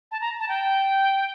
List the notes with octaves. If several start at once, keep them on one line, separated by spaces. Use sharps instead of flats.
A5
A#5
A5
G5